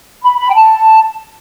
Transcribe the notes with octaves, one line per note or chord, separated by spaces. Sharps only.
B5
B5
G5
A5